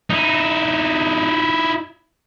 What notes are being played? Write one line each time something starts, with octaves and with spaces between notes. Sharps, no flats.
D#4 E4